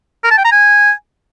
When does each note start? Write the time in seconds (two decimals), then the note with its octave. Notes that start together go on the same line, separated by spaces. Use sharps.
0.24 A#4
0.31 A5
0.38 G5
0.45 A#5
0.52 G#5